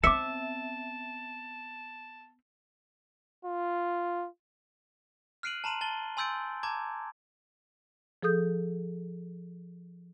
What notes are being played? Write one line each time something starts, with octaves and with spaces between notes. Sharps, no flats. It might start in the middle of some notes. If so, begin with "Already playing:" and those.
B3 C4 E5 A5 D6 C#7
F4
F6 F#6 C7 D7 D#7 F#7
A5 A#5 C6 D#7 F#7
A5 A6 G7
G#5 C6 E6 G6 A6 D7
A5 A#5 D6 G#6
F3 G#4 A4 D#6 G6